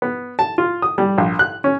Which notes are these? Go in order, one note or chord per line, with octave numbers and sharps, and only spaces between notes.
B3
A5
F4
D#6
G3
A#1
F#6
C#4